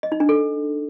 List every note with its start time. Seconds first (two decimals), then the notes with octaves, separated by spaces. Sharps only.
0.03 D#5
0.12 D#4
0.20 D4
0.29 A4